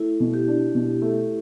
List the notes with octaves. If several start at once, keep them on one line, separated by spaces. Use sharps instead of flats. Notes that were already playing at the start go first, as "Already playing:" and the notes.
Already playing: A3 E4
B2
G4
D4
B2
A3